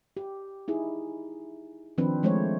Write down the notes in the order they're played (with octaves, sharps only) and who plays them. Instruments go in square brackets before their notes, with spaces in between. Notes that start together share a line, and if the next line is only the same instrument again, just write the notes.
[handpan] G4
D#4 E4 G#4
D#3 F3 C4 D4 B4
D#3 F3 G#3 A3 C5 C#5